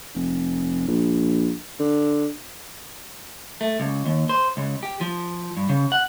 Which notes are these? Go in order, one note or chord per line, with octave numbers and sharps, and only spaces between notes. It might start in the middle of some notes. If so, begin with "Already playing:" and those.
F1
A#1
D3
A3
C#2
D#2
C5
C#2
G4
F3
G2
C#3
F#5